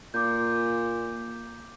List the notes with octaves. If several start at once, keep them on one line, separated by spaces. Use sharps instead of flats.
A#2 D6 G6